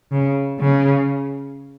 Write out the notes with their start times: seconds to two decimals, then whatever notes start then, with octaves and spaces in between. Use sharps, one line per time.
0.12 C#3
0.60 C#3